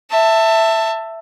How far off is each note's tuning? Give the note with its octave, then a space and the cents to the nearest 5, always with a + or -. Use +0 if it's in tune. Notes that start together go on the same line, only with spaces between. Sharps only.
E5 +0 A5 +20